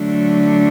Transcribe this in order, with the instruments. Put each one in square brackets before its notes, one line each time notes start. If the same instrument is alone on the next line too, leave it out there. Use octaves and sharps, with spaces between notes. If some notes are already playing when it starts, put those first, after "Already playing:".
Already playing: [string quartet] D3 F#3 A3 D4